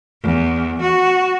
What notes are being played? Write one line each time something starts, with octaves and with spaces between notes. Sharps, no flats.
E2
F#4